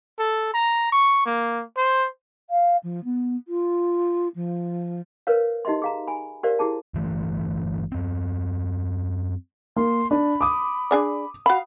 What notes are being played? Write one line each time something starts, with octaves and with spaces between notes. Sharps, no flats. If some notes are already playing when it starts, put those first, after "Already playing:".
A4
A#5
C#6
A#3
C5
F5
F3
B3
F4
F3
A#4 B4 C#5 F5
D#4 G4 D#5 E5 C6
G#4 F5 A#5
G#5 B5
G4 A#4 C5 D5 F5
E4 G4 G#4 A5
G1 E3 A3
F#2 C4
A#3 C6
D4 B5
D6 D#6
D4 G#4 D5
F#4 F5 B5